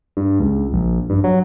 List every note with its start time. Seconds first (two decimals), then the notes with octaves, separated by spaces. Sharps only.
0.17 G2
0.40 C#2
0.73 A#1
1.10 G2
1.24 F#3